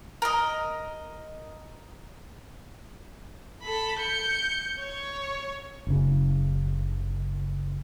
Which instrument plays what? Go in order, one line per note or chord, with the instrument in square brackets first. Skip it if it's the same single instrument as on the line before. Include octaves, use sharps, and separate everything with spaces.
[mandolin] A#4 D#5
[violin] A4 B5
G6 C#7
C#5
[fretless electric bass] F#1 C#3